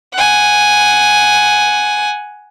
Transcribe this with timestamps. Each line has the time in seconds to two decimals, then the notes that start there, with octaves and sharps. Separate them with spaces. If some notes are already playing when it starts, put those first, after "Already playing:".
0.14 F#5 G#5